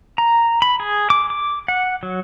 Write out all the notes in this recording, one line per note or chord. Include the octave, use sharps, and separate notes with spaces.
A#5
B5
G#4
D6
D6
F#5
F#3